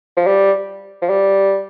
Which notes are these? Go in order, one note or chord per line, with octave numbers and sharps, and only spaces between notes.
F3
G3
F3
G3